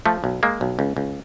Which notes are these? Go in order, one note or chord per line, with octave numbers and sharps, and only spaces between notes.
F3 A3
B1
G#3 A#3
B1
C#2
C#2